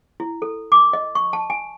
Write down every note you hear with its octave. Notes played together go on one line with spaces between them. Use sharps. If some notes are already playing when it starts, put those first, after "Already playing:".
E4
A4
D6
D#5
C#6
A5
G#5